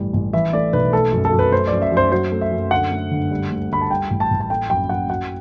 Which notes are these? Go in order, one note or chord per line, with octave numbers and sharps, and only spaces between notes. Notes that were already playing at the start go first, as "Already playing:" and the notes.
Already playing: A1 G3
A1
E3 E5
A3 D5
B1 B4
A3 A4
F#2
A4
F#2
B4
A3 C5
F#2 D5
E5
F#2 C5
F#3 C5
A3
E5
F#2
D3 F#5
A3
G1
G3
D2
D2 B5
A5
G3 G5
A1
A5
A1
A5
A3 G5
F#2 G5
F#2 F#5
F#3 F#5